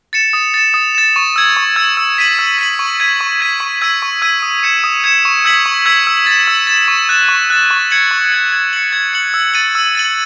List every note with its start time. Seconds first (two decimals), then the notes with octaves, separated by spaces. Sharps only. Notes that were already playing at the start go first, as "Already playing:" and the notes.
0.13 A6 C#7 E7
0.33 D#6
0.54 A6 E7
0.74 D#6
0.95 A6 E7
1.16 C#6
1.36 E6 G#6
1.56 C#6
1.76 E6 G#6
1.97 E6
2.18 B6 D#7 F#7
2.39 E6
2.59 B6 D#7 F#7
2.79 C#6
3.00 G#6 B6 D#7
3.21 C#6
3.41 G#6 B6 D#7
3.60 C#6
3.82 E6 G#6 B6 D#7
4.02 C#6
4.22 E6 G#6 B6 D#7
4.42 D#6
4.63 G#6 C#7 E7
4.84 D#6
5.04 G#6 C#7 E7
5.25 C#6
5.44 E6 G#6 B6 F#7
5.66 C#6
5.86 E6 G#6 B6 F#7
6.07 E6
6.26 A6
6.32 E7
6.48 E6
6.67 A6 E7
6.88 C#6
7.09 F#6 A6 E7
7.28 C#6
7.50 F#6 A6 E7
7.71 C#6
7.90 G#6 C#7 F#7
8.11 C#6
8.32 G#6 C#7 F#7
8.52 G#6
8.73 C#7 F#7
8.93 G#6
9.13 C#7 F#7
9.34 E6
9.54 A6 D#7 F#7
9.75 E6
9.95 A6 D#7 F#7